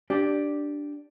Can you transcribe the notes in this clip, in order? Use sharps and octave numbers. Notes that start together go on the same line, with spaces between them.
D4 G4